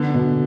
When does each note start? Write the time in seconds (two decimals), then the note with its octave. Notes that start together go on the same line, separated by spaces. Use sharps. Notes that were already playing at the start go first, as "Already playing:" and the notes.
Already playing: D3 B3
0.14 B2